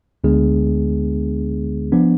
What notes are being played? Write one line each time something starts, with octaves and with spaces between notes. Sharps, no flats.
D2 D3 G#3 B3 D4 G#4
F3 B3 D4